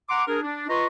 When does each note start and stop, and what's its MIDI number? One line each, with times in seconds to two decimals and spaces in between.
0.09 0.23 78
0.09 0.23 82
0.09 0.23 84
0.09 0.23 86
0.28 0.43 62
0.28 0.43 68
0.28 0.43 70
0.43 0.65 62
0.68 0.86 65
0.68 0.86 71
0.68 0.86 75
0.68 0.86 82
0.68 0.86 84
0.68 0.86 85